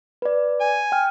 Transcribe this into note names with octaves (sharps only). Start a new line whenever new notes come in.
B4 D5
G#5
G5 F6